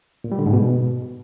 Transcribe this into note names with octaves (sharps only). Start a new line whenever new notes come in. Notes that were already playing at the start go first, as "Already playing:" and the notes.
A#2
G3
D3
G#2
B2